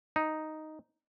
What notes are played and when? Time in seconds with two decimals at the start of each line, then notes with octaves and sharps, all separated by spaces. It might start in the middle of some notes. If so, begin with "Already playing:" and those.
0.16 D#4